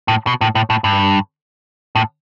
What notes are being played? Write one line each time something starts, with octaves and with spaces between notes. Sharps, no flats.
A2
B2
A2
A2
A2
G2
A2